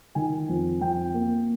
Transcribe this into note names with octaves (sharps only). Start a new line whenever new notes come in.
D#3 G#5
F2
F2 G5
A#3